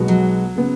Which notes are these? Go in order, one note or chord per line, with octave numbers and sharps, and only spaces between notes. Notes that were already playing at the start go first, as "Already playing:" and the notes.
Already playing: B1 B2 G#3 B3 F#4
F#3
C#3 B3